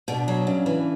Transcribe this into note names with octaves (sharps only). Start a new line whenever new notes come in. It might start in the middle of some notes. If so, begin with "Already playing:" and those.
B2 D4
F#3
C#3
E3